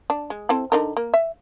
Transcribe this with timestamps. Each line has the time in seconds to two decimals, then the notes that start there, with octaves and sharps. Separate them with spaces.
0.10 D4
0.30 G#3
0.49 C4 E4 A4
0.72 D3 D#4 A#4
0.97 A#3
1.14 E5